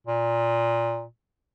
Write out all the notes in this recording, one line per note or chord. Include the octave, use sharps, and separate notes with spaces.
A#2